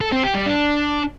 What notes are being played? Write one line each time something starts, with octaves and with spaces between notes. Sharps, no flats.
A4
C4
G4
G3
D4